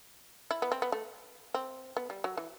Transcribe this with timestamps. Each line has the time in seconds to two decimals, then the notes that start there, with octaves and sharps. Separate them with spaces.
0.51 E4
0.62 B3
0.72 C4
0.82 B3
0.92 A3
1.54 C4
1.97 B3
2.10 G3
2.24 F#3
2.37 E3